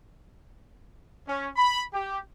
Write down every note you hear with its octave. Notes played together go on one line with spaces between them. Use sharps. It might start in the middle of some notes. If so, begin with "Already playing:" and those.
C#4
B5
G4